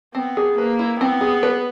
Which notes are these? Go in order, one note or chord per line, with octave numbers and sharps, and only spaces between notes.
B3 C4
G#4
A#3 B4
E4
B3 C4
G#4
B4